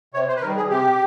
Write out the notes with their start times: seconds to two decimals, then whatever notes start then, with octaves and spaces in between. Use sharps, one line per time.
0.14 C3 C#5
0.29 C5
0.36 B4
0.42 D#3 G3 A#4
0.56 G#4
0.70 C3 G4